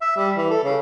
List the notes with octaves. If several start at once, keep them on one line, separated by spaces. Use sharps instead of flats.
E5
G3
E3
A4
C#3